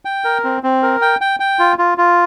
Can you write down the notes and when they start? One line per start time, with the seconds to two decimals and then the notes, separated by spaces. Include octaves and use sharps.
0.05 G5
0.24 A#4
0.44 C4
0.63 C4
0.83 A#4
1.02 G5
1.21 G5
1.40 G5
1.59 F4
1.78 F4
1.98 F4